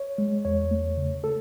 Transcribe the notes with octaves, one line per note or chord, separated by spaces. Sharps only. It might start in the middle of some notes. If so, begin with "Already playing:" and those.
Already playing: C#5
G#3
E2 C#5
A3
C#3
A4